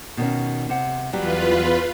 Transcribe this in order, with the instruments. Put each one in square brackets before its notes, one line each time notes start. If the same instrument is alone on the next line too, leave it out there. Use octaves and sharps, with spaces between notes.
[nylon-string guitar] B2 D#3 C#4
C3 F#5
[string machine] E2 F4 B4 [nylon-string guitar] F#3 G3 G4